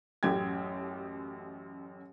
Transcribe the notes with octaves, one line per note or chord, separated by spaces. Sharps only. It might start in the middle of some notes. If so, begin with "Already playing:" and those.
A1 F#2 G4 G5 G#6